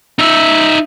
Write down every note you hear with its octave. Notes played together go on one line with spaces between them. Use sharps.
D#4 E5